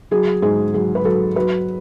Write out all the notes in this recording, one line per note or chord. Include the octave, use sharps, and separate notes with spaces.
F#3 G#4
G#2 G#4
F#3 G#4
B4
F#3 A4
F#3 B4